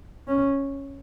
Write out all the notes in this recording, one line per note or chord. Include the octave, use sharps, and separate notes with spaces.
C#4